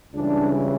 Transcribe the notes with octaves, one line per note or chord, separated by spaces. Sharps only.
C#2 C#3 E3 G3 D4